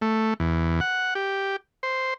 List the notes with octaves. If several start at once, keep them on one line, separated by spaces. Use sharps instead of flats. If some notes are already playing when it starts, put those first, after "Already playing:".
A3
E2
F#5
G4
C5